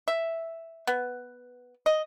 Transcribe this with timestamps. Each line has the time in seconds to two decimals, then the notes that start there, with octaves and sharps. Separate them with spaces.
0.08 E5
0.87 B3
1.86 D#5